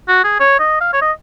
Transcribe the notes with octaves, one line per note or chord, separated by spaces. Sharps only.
F#4
G#4
C#5
D#5
F5
C#5
D#5